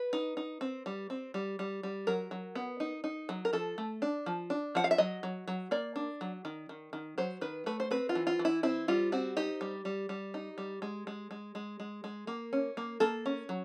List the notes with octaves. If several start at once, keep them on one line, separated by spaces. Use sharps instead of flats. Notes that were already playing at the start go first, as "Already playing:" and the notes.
Already playing: B4
D#4
D#4
C4
G3
C4
G3
G3
G3
F#3 A#4
F#3
B3
D#4
D#4
F#3
A#4
F3 A4
A3
D4
F3
D4
F3 F#5
F5
E5
F#3 D#5
F#3
F#3
A#3 D5
D4
F#3
D#3
D#3
D#3
F#3 C5
D#3 B4
A3 B4
C5
C4 B4
F4
E3
F4
E3
E4
C4 E4
G3 F4
C4 F#4
D#4 G4
G3
G3
G3
D#4
G3
G#3
G#3
G#3
G#3
G#3
G#3
A#3
C#4
A#3
A#3 A4
C#4
F#3